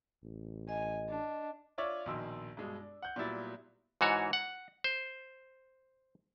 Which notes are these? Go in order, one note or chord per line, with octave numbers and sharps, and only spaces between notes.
A1
D#5 G#5
D4
D4 F4 C#5 D5 E5
A#1 B2 D#3 D#5 C6 E6
G2 B2 G#3
D4
F#5 G6
A#2 F#3 G3 B3 E4 A6
G#2 E3 F#4 C#5
F#5
C5